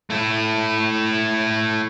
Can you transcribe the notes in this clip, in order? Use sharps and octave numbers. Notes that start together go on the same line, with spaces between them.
A3 E4